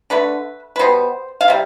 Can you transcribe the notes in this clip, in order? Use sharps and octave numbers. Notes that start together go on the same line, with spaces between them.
D3 A3 B4
B4
B2 G3 B3 C5
F5
C3 G3